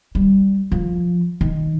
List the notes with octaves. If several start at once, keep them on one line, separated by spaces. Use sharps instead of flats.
G3
F3
D#3